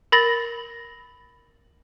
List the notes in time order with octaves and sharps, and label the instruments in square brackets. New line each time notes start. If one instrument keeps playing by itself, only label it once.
[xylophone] A#4 B5 A6 A#6 F#7